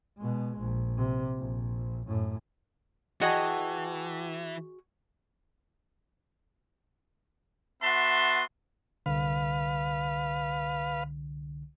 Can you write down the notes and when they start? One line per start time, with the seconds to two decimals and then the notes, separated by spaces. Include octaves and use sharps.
0.18 B2 G#3
0.59 A#1
0.97 C3
1.38 A#1
2.07 F#2 A2
3.21 E3 F#4 G#4 D#5 F#5 G5 A5
7.83 B3 F#4 E5 A5 C6
9.06 C2 D3 B4 F5